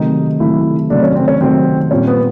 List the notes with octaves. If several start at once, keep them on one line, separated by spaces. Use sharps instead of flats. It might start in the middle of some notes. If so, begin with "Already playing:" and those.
Already playing: C3 D#3 F#3 A3 D#4
C3 D#3 F#3 A3 E4
C3 D#3 F#3 A3 D4
C#4
C4
C#4
C3 D#3 F#3 A3 C4
A#2 G3 C4 C#4
B3